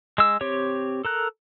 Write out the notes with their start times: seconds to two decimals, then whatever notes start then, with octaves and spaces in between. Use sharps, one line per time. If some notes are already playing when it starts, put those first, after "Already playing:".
0.18 G#3 E6
0.41 C4 G4 C#5
1.05 A4 A#4 F#6